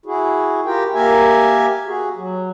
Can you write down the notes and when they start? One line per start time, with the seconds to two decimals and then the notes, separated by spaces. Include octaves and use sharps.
0.06 E4 F#4 G#4
0.65 F4 G4 A#4 G5
0.94 A#3 G4 A#4 E5 G#5
1.86 F#4 G#4
2.16 F#3